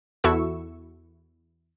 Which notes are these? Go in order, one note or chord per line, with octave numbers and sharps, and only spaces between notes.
E2 E4 F#4 A4 C#6 E6